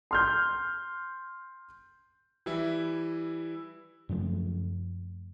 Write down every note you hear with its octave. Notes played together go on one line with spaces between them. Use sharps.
C6 F6 G6
E3 G3 E4
F#2 C#3 F3 A3